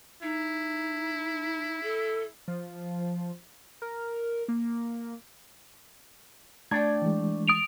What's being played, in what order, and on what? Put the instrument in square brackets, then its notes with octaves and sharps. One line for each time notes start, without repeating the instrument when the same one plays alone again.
[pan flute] D#4 [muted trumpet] E4
[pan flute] A4
[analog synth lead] F3
A#4
A#3
[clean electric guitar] A3 D4 A5 [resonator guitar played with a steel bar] D5 G5 [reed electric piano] G#6
[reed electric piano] E3 G#3
[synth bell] D#6 D7 F7